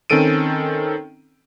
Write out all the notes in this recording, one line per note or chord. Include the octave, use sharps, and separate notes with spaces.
D#3 C4 C#4 A4 D7 D#7